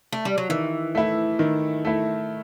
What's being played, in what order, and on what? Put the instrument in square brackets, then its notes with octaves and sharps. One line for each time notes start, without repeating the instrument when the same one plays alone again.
[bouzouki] A3
G3
F#3
[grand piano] D#3 [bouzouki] E3
[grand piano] A3 E4
D#3
A3 E4